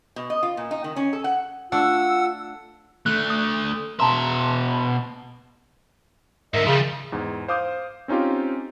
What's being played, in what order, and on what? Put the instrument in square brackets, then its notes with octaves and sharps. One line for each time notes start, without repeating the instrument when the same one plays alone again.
[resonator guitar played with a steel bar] B2
D#5
F4
A#2
D#4
D#3
C#4
A4
F#5
[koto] A3 D4 [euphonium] F4 [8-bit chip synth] F#5 [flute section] E6
[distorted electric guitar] D3 A3 [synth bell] F#6
[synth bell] D#6
[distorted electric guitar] B2 E5 [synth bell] A5 A#5 C6
[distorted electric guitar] G#2 D3 [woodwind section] A#4 D#5 E5
[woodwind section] C#3 [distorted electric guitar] F3 G3
[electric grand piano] E2 G#2
C5 F5 D6 D#6 G6
C4 C#4 D#4 F4 G4